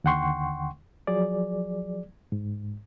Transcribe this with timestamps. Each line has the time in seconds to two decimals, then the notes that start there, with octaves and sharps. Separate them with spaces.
0.04 D#2 D3 F#5 G5 C6 C#6
1.07 F3 F#3 G#4 D5
2.32 G#2